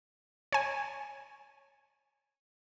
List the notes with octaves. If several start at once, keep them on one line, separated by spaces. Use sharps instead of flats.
C#5 G#5